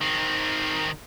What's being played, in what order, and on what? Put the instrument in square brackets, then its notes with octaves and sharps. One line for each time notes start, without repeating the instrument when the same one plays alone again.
[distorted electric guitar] D#3 C4